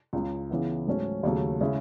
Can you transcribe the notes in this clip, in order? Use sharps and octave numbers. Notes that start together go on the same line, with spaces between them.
C#2 C#3 G#3
C#3 E3 B3 E4
G#2 F#3 A3 C#4
D#2 C#3 F#3 A3
C#3 G#3 C#4 E4